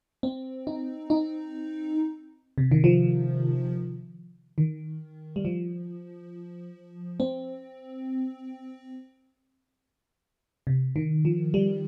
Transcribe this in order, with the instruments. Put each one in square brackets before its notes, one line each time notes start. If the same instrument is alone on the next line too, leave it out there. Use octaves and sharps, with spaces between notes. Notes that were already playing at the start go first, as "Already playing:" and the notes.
[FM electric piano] C4
D#4
D#4
C3
D#3
F3
D#3
G3
F3
C4
C3
D#3
F3
G3